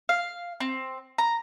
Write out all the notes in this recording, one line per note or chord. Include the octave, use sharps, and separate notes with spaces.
F5
C4
A#5